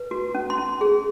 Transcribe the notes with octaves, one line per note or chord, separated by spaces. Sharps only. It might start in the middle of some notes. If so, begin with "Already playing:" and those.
Already playing: B4
F#4
C#4
C6
C#4
G#4